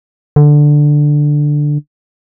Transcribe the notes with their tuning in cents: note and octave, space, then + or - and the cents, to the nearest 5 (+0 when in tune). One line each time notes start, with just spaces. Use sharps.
D3 +5